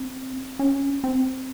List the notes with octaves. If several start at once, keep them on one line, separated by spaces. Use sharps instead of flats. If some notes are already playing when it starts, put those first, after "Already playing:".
Already playing: C4
C#4
C4